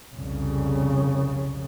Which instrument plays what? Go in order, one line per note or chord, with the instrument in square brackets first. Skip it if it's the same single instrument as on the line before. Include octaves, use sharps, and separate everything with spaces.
[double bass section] C2 F2 C#3